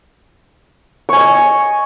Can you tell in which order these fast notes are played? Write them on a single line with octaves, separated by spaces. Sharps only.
C#6 G#5 D#5